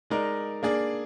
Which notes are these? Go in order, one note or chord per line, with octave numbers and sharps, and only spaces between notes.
G#3 D#4 A#4 D5
A#3 D4 G#4 D5